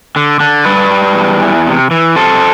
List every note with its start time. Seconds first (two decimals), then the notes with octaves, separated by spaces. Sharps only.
0.16 D3
0.40 D3
0.65 G3 B4 D5
0.91 G3
1.15 E2
1.42 E3
1.67 C3
1.91 E3
2.16 C3 A4 C5